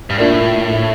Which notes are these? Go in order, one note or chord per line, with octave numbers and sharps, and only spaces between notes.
G2
A2 A#3 D4 F4 A#4 D5